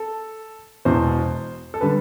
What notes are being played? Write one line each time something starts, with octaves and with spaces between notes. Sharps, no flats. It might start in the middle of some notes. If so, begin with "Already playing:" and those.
Already playing: A4
E1 E2 B2 C5
A4
D3 G3 B4